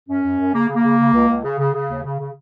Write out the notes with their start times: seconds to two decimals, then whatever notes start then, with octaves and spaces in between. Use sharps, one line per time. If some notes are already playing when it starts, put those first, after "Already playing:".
0.09 F#2 C#4
0.23 F#2
0.39 F#2
0.54 C#3 A#3
0.69 C#3
0.76 A#3
0.84 C#3
0.99 C#3
1.14 C#2
1.29 C#2
1.44 C#3
1.59 C#3
1.74 C#3
1.89 D#2
2.04 C#3
2.19 C#3